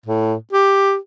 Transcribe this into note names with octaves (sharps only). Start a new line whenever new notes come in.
A2
G4